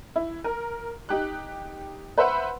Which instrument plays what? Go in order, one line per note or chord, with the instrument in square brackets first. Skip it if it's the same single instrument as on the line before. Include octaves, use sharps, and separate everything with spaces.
[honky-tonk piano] E4
A#4
D#4 G4 F#6
B4 C5 E5 F#5 B5